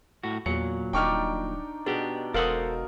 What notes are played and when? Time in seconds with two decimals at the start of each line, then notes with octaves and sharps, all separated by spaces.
0.23 A2 F#4
0.46 E2 A#2 F#3 C#7
0.93 D#1 D4 D#4 D5 G5 C#6 F6
1.86 B2 D4 G4 G#4
2.34 E1 A4 A#4 C5 F5 F#5 D#6